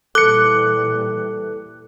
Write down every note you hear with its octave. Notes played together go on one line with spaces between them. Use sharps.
A#2 E3 G3 A4 D6 F#6 C#7